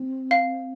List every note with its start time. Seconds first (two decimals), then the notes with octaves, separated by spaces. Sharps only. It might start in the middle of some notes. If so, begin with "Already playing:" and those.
Already playing: C4
0.31 F5